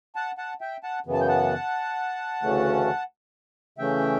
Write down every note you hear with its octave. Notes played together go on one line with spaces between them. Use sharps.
F#5 A5
F#5 A5
E5 G5
F#5 A5
F#2 C#3 E3 B3
A5
G5
F#5 A5
D2 C#3 E3 A3 C#4
C#3 E3 A3 C#4 E5 G5